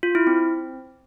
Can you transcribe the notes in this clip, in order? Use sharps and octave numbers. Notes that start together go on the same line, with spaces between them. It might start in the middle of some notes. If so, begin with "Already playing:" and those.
F4
E4
C4